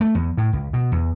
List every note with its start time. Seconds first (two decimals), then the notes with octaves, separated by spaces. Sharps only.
0.01 A3
0.15 E2
0.37 A2
0.53 C#2
0.73 B2
0.92 E2